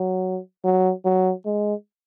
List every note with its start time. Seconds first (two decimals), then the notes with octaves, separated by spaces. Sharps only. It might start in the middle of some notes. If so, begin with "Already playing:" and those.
Already playing: F#3
0.64 F#3
1.05 F#3
1.45 G#3